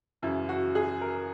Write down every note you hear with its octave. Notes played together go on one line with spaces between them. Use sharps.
F#2 C#3 E3 E4
F#4
G#4
A#4